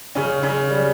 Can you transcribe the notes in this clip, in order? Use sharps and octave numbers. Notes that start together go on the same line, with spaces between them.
C#3 C#4
C#3 C#4
G3